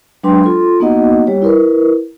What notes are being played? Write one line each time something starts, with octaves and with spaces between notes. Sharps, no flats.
F#3 G#3 D4 B4 G5 C6
F4 A4 C6
A#3 B3 D#4 F#4 D#5 F#5
G3 G4 C#5
E4 A#4 B4